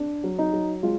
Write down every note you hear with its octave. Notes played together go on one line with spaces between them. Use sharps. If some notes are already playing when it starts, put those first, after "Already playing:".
Already playing: D4
F#3
D#4
F#3
G#3 F4